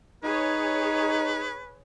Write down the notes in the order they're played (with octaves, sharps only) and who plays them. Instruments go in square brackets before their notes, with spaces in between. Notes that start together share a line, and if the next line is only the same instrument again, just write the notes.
[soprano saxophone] D#4 [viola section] G#4 C#5 [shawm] B4